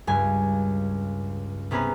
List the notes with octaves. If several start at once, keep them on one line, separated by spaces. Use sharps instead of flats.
C#2 G2 G#5
C3 B3 C#4 G#4 B4 A#5